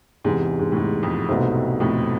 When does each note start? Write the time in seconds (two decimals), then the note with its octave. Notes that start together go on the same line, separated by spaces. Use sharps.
0.24 E2 G#2 C3 G#3
0.59 G#2
0.72 A2
0.76 G#2
1.03 F2
1.28 C2 G#2 B2 A3 C4
1.80 F2 A2